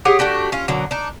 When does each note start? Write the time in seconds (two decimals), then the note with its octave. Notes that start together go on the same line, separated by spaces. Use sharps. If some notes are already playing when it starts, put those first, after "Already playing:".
0.05 G4 G#4 C#5 F#5
0.19 A3 D4 F#4 G4
0.52 C#4 F4
0.68 B2 D3 F#3 A#3
0.91 D4 D#4